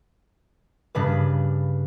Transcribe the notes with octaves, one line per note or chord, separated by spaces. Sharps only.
G2 C#3 D4 B4